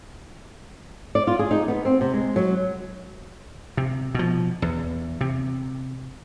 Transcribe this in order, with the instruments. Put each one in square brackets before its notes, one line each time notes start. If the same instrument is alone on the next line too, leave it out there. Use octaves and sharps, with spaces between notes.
[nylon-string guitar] D5
F4
G#4
D#4
B3
C4
C3
G#3
F#3
[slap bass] C3
B2 F3
E2
C3